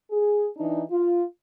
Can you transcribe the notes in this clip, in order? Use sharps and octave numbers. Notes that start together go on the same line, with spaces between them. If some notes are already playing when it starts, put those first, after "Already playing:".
G#4
E3 D4 D#4
F4